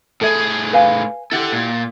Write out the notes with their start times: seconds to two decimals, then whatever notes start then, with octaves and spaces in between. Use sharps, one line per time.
0.21 A2 G#4 A4 E5
0.73 B4 F5 G#5
1.31 E4 G4 A4 F#5
1.52 A#2